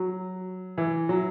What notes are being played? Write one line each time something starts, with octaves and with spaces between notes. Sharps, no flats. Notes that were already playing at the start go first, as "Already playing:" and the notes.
Already playing: F#3 F#4
E3
F#3